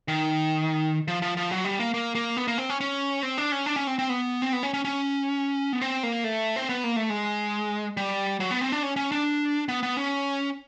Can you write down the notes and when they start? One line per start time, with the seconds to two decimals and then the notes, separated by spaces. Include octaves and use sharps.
0.08 D#3
1.08 F3
1.22 F3
1.37 F3
1.51 F#3
1.65 G3
1.80 A#3
1.94 A#3
2.15 A#3
2.37 B3
2.48 A#3
2.58 C4
2.70 C#4
2.81 C#4
3.23 C4
3.38 D4
3.52 C#4
3.66 D4
3.76 C#4
3.87 C4
3.99 C4
4.09 B3
4.42 C4
4.53 B3
4.63 C#4
4.74 C#4
4.85 C#4
5.73 B3
5.81 C4
6.03 A#3
6.24 A3
6.56 C4
6.69 B3
6.84 A#3
6.96 A3
7.10 G#3
7.97 G3
8.40 F#3
8.51 B3
8.61 C4
8.72 D4
8.83 C#4
8.96 C#4
9.12 D4
9.69 B3
9.83 B3
9.97 C#4